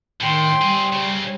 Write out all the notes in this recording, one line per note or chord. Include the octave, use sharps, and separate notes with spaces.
A2 D#3 G5 C6
G3 C4 G#4
C#3 C4